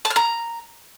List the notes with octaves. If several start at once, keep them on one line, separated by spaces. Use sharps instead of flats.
A5
F6
A#5